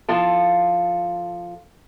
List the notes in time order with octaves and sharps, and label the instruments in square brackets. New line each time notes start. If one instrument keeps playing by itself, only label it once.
[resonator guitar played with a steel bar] F3 E4 F4 A4